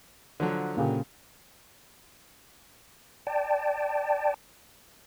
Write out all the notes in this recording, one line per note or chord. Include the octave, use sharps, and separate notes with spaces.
D3 F3 F#3
A#2 C#3 G4
D5 G5 A5